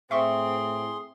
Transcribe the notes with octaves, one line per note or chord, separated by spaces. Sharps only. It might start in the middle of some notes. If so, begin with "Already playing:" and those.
A2 C4 G#4 E5 C6 C#6